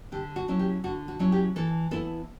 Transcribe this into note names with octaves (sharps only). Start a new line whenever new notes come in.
D3 G4
F#4
F#3 C#4 E4
G4
D3 F#4
F#4
F#3 C#4 E4
G4
E3 A4
B3 E4 A4